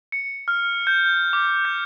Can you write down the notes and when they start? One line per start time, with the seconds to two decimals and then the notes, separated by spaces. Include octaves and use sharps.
0.12 C#7
0.48 F6
0.87 G6
1.33 D6
1.65 G6